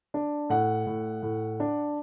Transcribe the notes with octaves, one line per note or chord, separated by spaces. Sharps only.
D4
A2 F#5
A2
A2
D4